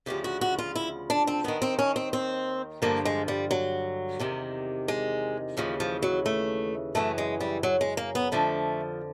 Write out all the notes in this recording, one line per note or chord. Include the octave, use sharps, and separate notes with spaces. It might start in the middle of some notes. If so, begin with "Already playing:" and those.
D2 C#3 F3 G4
F#4
F#4
F4
E4
D4
C4
D#2 D#3 B3
C4
C#4
C4
C4
G2 D3 F3 A#3
G#3
G3
F#3
E2 C3 D#3
G#3
D#2 C#3 E3 F3
F3
F#3
A3
F#2 C#3 E3 A3
G#3
G3
F#3
G#3
A#3
B3
F2 D3 F3 A3